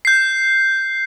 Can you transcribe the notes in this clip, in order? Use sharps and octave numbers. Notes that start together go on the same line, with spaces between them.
G6 C7